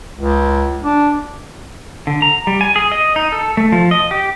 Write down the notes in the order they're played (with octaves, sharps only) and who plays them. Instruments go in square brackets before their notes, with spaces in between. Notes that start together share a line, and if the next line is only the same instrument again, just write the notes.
[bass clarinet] C#2
D4
[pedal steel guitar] D3
A#5
G3
G#5
G#4
D#5
D#4
A4
A3
F3
D#5
G4